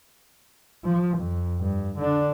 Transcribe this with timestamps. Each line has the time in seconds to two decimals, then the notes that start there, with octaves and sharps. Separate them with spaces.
0.85 F3
1.18 F2
1.60 G2
1.98 D3 D4